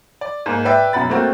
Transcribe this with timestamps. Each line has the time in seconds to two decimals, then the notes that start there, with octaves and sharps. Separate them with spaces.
0.21 D5
0.46 G#2 A#3
0.65 B4 D5 E5 G5
0.93 F#2 B2 F#5 B5 A6
1.09 A3 A#3 C4 F#4